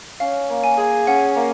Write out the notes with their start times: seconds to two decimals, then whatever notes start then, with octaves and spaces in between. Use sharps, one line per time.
0.20 C#4 F5
0.49 A#3
0.64 G#5
0.78 G#4
1.07 C#4 F#5
1.36 A#3